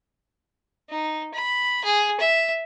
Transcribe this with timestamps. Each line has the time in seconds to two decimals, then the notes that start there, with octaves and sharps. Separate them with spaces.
0.90 D#4
1.34 B5
1.84 G#4
2.20 E5